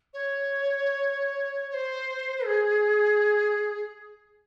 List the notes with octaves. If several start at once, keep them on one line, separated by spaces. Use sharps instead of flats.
C#5
C#5
C5
G#4